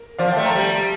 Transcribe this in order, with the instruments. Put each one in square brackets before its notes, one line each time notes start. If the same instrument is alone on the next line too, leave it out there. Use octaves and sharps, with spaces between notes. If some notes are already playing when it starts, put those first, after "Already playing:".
Already playing: [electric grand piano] A#4
[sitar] F3 [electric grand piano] D5 F5
[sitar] A3 [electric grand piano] E5 G5
[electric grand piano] G5 A#5
[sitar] G3